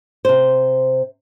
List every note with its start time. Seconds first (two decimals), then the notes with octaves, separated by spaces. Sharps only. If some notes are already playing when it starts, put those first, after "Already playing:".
0.25 C3 C5